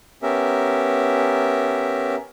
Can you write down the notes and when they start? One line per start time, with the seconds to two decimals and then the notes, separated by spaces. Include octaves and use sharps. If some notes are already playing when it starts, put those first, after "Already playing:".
0.23 B3 C#4 G4 A#4 E5